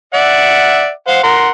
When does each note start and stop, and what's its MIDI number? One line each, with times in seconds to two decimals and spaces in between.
0.14 0.90 74
0.14 0.90 76
0.14 0.90 78
1.07 1.22 72
1.07 1.22 77
1.07 1.22 78
1.23 1.50 70
1.23 1.50 78
1.23 1.50 84